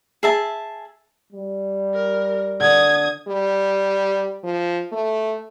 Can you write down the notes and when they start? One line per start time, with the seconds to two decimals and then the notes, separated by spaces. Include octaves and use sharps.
0.23 G#4 E5 A5
1.33 G3
1.94 A#4
2.60 D3 D#6 G#6
3.28 G3
4.44 F3
4.92 A3